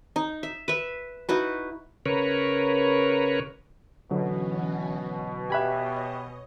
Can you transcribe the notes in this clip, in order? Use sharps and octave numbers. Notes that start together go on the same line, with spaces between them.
D#4
E5
B4 E5
D#4 E4 F#4 B4
C#3 A#4 B4 C#5
B2 D3 E3 F#3 C#4 F#4
G4 C#5 D#5 E5 G#5 B5 F#6